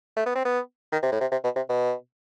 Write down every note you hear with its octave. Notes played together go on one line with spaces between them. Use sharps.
A3
B3
C4
B3
D#3
C3
A2
C3
C3
B2
C3
B2